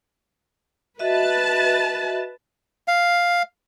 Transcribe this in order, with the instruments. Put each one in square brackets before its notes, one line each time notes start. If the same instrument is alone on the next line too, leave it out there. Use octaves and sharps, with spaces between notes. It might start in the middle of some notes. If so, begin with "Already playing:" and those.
[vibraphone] F#4 D#5 E5 [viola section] B4 A5
[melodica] F5